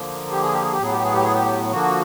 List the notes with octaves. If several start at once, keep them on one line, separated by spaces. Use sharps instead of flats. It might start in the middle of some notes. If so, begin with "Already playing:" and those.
Already playing: D3 F3 A#3
G4
G#4
G4
G#4
G4
A2 F#3 B3 G#4
G4
G#4
G4
G#4
G4
D3 F3 A#3 F#4